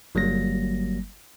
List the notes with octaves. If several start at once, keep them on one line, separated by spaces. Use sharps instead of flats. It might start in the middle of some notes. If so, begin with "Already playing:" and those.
G1 F#3 G3 A#3 A#6